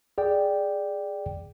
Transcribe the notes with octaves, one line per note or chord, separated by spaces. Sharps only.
G#4 D5 G5